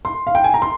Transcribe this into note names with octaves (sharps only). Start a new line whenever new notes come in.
C6
F5
G5
G#5
A#5
C6